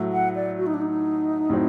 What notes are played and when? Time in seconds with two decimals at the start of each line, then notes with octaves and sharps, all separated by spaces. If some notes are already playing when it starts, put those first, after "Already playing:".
Already playing: A2 F#3 A3
0.13 F#5
0.35 D5
0.58 F#4
0.66 D#4
0.74 D4
0.81 D#4
1.49 A2 F#3 C4